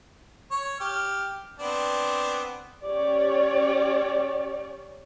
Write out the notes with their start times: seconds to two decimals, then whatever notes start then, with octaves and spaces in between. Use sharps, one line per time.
0.51 C#5
0.80 G4 F6
1.59 B3 C4 D4
2.83 C#4 G4 C#5 D5